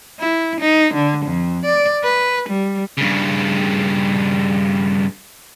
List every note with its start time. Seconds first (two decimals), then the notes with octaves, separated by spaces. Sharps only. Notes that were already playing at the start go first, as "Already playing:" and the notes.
0.19 E4
0.61 D#4
0.94 D3
1.25 F2
1.65 D5
2.04 B4
2.49 G3
2.97 G2 C#3